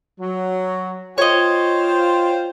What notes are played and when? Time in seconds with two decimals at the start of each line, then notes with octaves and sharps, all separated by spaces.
0.21 F#3
1.18 F4 C5 C#5 D#5 G5